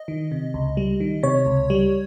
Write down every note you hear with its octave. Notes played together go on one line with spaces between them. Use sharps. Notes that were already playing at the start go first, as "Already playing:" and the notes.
Already playing: D#5
D#3
C3
C#2
G3
D#3
C3 C#5
C#2
G3